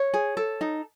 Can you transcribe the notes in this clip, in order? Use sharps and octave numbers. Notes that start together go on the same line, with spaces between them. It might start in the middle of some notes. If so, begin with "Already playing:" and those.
Already playing: C#5
G#4
A4
D#4